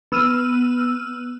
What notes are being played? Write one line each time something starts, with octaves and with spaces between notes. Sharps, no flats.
B3 E6 F6 D#7